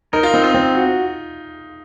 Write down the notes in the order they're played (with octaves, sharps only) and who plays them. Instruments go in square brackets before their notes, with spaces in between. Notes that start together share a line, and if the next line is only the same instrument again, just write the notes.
[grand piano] D#4 [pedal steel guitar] A#4
[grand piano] F4
[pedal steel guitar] C4 [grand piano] D#4
[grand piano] F4
[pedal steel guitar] C4
F#4